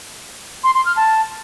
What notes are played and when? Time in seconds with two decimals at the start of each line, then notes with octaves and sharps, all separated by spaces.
0.64 C6
0.75 C6
0.85 F6
0.96 A5